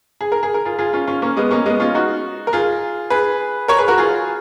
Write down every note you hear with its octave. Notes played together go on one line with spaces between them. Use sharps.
G#4
A#4
G#4
A#4
F4 G#4
F4 G#4
C#4 F4
C#4 F4
A#3 C#4
G#3 B3
A#3 C#4
G#3 B3
C#4 F4
D#4 F#4
A#4
F4 G#4
G#4 B4
A#4 C#5
G#4 B4
F#4 A#4
F4 G#4